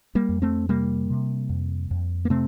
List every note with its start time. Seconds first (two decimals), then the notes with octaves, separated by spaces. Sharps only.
0.15 G3 A#3
0.29 F2
0.42 A3 C4
0.69 C3 G3 A#3
1.10 C3
1.49 F2
1.91 F2
2.25 A#3
2.30 C3 A3 C4